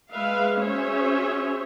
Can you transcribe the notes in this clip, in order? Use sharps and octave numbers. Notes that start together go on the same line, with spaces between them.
G#3 B4 E5 F5
C#4 F#4 G#4 C5 C#5 E5